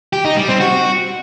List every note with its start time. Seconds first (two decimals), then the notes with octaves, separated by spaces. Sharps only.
0.13 G4
0.25 D#4
0.37 G3
0.48 C4
0.60 F#4